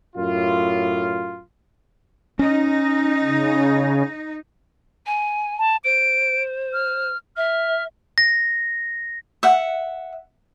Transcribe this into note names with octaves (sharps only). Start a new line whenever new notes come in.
F#2 A2 F4
C#4 D#4
C#3
G#5
A5
C5 D7
F6
E5 F6
A#6
E5 F#5